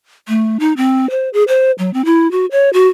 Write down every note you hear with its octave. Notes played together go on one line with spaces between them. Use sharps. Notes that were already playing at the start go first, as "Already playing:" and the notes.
A3
D#4
C4
C5
G#4
C5
F#3
C4
E4
F#4
C#5
F#4